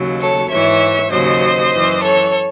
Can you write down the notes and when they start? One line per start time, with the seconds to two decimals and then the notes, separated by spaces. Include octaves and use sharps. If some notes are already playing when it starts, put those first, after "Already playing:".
Already playing: D#2 C#3 F#3
0.20 A4 C#5
0.50 G#2 E3 C#5 E5
1.11 D#2 C#3 F#3 C5 D#5
1.71 F#2 E3
2.02 A4 C#5